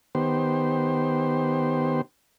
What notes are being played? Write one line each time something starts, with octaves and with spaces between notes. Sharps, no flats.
D#3 B3 G4 C5